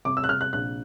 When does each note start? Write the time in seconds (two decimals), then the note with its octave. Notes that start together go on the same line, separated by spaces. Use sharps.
0.05 C3 D6
0.17 E6
0.24 F#6
0.29 C3 F6
0.41 F#6
0.53 A#1 F#6